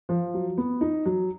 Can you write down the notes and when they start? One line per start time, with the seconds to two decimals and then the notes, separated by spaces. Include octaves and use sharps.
0.09 F3
0.34 F#3
0.58 B3
0.81 D#4
1.05 F#3